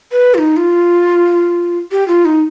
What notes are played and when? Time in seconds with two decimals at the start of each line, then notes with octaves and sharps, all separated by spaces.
0.12 B4
0.34 F4
0.38 D#4
0.57 F4
1.91 G4
2.08 F4
2.25 D#4